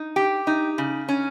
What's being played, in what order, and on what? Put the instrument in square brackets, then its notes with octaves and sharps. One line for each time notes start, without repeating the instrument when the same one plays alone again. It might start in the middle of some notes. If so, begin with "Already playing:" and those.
Already playing: [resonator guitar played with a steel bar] D#4
G4
D#4
C#3
C#4